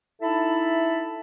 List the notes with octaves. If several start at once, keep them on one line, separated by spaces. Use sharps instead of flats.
D#4 E4 A4 E5 A5 B5